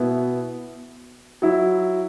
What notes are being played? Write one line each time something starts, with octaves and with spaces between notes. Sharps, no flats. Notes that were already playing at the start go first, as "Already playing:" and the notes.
Already playing: B2 B3 E4
F#3 E4